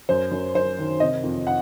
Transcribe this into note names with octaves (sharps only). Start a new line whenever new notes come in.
F#2 C5
F#2
F#2 C5
D#3
C3 D#5
F2
F#5